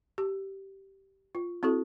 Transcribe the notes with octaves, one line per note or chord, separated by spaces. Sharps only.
G4
F4
C4 E4 F#4 A4